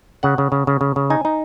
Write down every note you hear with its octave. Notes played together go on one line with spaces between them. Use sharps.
C#3 F#5
C#3
C#3
C#3
C#3
C#3
D#4 G#5
D#4